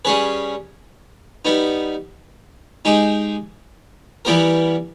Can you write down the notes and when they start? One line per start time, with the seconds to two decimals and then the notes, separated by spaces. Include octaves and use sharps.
0.05 G3 C#4 G#4 B4
1.45 G3 B3 D#4
2.85 G#3 D#4 G4
4.25 E3 G3 B3 G4 A#4